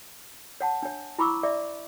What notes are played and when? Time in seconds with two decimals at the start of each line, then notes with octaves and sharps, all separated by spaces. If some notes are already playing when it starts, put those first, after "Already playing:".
0.60 C#5 F#5 A5
0.83 D4 C#5
1.19 E4 A#5 B5 C#6 D6 E6
1.43 D5 E5 D6